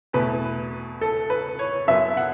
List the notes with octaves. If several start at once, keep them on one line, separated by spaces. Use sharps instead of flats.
E2 B2 A3 B4
A4
B4
C#5
F#2 F#3 B3 E5
F#5